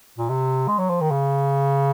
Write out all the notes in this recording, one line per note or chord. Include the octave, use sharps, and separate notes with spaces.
A#2
C3
G#3
F#3
F3
D#3
C#3